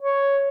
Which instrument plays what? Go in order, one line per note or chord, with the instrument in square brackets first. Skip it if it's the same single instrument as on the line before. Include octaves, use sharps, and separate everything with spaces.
[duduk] C#5